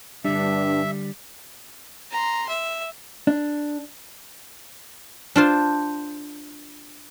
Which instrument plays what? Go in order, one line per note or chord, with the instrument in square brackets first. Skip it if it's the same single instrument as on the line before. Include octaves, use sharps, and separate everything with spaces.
[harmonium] G2 [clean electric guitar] D3 G3 [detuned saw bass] D4 [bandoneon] E5
[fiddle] A#5 C6
E5
[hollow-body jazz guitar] D4
[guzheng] D4 F4 C5